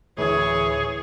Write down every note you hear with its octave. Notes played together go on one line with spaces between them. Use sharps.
D2 A2 E3 G#4 C#5